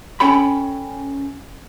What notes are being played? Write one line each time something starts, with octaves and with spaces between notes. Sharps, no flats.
C#4 A4 G5 B5